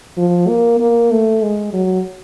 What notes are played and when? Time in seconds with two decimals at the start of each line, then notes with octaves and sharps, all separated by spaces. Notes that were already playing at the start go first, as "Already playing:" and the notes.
0.17 F3
0.48 A#3
0.80 A#3
1.11 A3
1.42 G#3
1.73 F#3